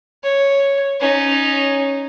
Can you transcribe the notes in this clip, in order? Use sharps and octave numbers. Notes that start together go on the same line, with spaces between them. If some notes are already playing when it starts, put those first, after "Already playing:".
C#5
C#4 D#4